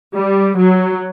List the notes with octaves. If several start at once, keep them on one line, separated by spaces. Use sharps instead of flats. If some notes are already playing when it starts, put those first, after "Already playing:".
G3
F#3